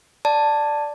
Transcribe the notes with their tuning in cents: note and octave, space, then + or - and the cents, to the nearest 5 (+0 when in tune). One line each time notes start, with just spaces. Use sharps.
D5 +0 A5 +5